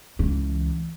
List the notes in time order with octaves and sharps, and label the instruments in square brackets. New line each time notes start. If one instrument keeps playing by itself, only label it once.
[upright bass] C#2 E3